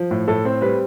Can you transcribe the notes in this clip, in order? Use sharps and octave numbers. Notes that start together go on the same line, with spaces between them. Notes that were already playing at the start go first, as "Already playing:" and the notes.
Already playing: F3
A2
A2 A4
C4 C5
G3 B4